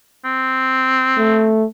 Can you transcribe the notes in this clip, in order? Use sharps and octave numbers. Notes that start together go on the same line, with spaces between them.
C4
A3